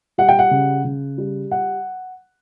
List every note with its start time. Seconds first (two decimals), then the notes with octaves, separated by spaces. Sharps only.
0.18 G3 F#5
0.29 G5
0.39 F#5
0.51 C#3
0.85 C#3
1.18 G3
1.51 F#5